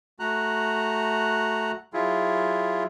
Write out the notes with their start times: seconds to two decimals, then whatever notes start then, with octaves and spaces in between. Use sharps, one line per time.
0.20 A3 F#4 A#5 F#6
1.93 F#3 E4 F4 G#4